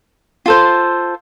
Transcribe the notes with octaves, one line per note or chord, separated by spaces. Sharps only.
F4 A4 C5